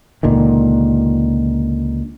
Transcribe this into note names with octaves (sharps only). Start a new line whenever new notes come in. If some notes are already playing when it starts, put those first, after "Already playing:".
C#2 A#2 D3 D#3